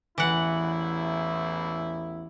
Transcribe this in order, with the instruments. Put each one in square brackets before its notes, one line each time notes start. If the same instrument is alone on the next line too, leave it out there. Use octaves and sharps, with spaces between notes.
[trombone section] A1 E2 E4 [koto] E3 F#5